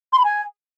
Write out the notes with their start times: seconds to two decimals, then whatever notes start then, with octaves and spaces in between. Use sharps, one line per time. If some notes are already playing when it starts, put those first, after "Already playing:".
0.13 C6
0.18 B5
0.24 G#5